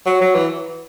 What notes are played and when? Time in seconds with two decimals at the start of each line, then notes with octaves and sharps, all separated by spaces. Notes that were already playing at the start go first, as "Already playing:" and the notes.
0.06 F#3
0.21 F#3
0.35 E3